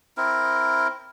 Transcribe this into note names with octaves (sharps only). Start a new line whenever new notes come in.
C4 E4 A#4